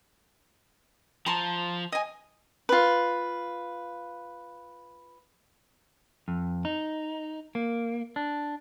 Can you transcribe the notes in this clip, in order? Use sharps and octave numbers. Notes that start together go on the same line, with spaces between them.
F3 A5 A#5 C6
D#5 G#5
F4 B4
F2
D#4
A#3
D4